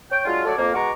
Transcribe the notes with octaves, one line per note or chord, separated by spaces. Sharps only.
C#5 G5
F#3 G#3 D4 F4
F#3 A3 A4 C#5 D5
F2 A#3
B2 G#3 F#5 A#5 C#6 D6